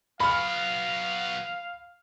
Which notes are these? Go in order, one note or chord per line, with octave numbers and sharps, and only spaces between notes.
F#3 B3 F5 B5 F6